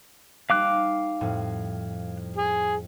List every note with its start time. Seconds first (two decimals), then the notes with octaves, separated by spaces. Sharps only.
0.50 G3 A#3 D#4 F5 D6 F#6
1.21 F2 A2
2.36 G#4